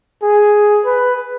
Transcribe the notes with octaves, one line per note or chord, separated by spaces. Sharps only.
G#4
B4